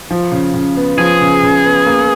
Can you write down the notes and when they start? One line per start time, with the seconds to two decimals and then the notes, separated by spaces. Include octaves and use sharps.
0.10 F3
0.32 C#3
0.54 C#3
0.77 B3
0.98 F3 G#4
1.21 C#3
1.43 C#3
1.65 B3
1.86 A#3